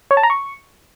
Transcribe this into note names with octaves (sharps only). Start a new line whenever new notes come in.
C#5
A5
A#5
C#6